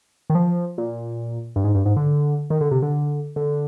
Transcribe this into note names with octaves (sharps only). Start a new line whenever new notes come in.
D#3
F3
A#2
G2
G#2
G2
G#2
D3
D#3
D3
C3
D3
D3